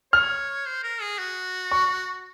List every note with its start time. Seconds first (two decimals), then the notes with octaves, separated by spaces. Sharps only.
0.13 C#5 F6
0.66 C5
0.83 A#4
1.01 G#4
1.19 F#4
1.72 C#6